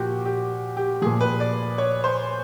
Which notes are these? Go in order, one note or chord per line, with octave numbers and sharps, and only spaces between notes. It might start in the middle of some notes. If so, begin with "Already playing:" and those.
Already playing: A#2 F3 F#4 G4
G4
G4
A#2 F3 G#4
B4
D5
C#5
C5